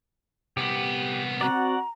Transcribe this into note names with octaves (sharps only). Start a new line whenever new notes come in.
C2 B3 G4
C4 F#4 D5 F#5 A#5